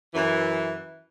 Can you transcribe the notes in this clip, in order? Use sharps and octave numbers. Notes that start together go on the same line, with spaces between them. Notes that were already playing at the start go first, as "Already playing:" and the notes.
F#2 E3